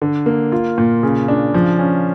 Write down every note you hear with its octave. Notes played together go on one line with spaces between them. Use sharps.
D3
A#3
F4
A#2
C#3
D4
F3
C#4